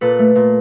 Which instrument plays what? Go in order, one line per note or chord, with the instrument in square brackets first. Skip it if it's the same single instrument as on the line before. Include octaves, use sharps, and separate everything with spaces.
[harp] A#2 A4 B4
A3
A#2